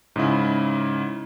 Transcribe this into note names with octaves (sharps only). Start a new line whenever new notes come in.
G#2 C#3 E4